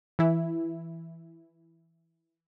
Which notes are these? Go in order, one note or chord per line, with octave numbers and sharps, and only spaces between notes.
E3 E4